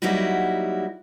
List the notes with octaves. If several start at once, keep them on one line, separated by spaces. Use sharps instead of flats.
F#3 G3 A#3 D#4 E4 F#4